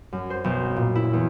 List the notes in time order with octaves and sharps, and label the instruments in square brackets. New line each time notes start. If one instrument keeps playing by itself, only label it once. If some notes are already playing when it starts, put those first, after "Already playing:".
[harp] F#2
C5
B1
A#2
E4
E2